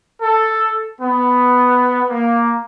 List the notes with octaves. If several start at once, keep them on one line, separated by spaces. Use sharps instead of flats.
A4
B3
A#3